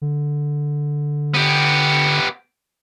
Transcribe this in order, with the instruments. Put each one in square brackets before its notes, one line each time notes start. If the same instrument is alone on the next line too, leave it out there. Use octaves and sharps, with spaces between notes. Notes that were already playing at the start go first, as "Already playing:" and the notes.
[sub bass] D3
[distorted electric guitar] B3 G4